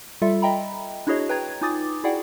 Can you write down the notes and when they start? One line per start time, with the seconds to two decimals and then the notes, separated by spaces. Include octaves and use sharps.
0.22 G3 F4 A4 E5
0.42 D#5 E5 G5 A#5 B5
1.07 D4 E4 F#4 G#4 C#5 D#5
1.29 B4 G5 A#5 G#6
1.61 D#4 F4 G#5 D6 D#6 A6
2.04 E4 F#4 G#4 D5 F#5 G5